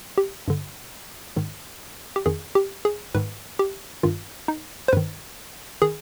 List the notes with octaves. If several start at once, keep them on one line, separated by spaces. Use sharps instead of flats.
G4
G2 D3
G#2 D#3
G4
F2 D#3 G#4
G4
G#4
G#2 D#3 B4
G4
G2 D#3 F4
D#4
C5
G2 D#3 B4
D#3 G#4